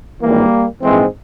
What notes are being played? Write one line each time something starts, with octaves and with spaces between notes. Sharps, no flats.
G#1 G2 E3 G3 A#3
A#1 G#2 E3 G#3 C4